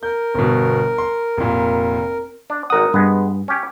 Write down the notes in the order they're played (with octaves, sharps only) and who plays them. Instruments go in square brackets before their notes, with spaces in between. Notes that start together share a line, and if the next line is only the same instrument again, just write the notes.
[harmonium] A#4 [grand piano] G6
[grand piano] G1 B2
C6
F1 A#2
[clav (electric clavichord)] D4
[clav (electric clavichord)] G#1 F#5 [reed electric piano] A#4 D#6
[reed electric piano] G2 [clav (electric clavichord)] G#3 B3
[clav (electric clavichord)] C#4 G4